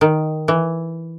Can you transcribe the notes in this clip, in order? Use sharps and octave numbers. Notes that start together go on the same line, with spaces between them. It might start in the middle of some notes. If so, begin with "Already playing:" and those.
D#3
E3